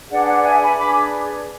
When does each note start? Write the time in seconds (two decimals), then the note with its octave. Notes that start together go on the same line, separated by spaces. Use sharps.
0.10 D4 G#4 B4 D5 F#5
0.27 D5 F#5
0.44 E5 G#5
0.61 G#5 B5
0.78 D4 G#4 B4 B5 D6